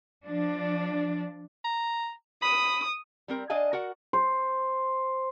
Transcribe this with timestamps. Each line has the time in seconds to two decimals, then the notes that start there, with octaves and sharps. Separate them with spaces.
0.25 F3 D4
1.65 A#5
2.43 B5 D#6
3.28 G3 C4 A#4
3.50 D4 D5 D#5 F5 G#5
3.73 F#4 A#4 D5 F#5
4.13 C5